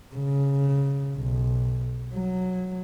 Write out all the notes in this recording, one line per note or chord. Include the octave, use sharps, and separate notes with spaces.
C#3
B1
F#3